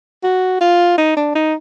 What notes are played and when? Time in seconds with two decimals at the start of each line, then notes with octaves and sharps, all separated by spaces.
0.24 F#4
0.61 F4
0.98 D#4
1.17 D4
1.35 D#4